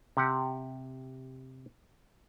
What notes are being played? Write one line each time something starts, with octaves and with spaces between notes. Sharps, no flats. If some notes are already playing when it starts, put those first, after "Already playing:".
C3 G4 F#5